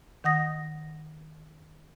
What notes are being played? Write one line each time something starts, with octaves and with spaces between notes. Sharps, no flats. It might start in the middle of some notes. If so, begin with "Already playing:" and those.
D#3 F#5 D#6 A#6